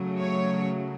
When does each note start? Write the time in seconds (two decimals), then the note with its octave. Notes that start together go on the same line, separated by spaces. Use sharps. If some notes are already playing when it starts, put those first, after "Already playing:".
Already playing: C#3 F#3 A3
0.19 C#5